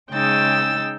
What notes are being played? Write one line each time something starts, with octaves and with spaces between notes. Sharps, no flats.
C#3 G#3 D#4 G5 E6 A6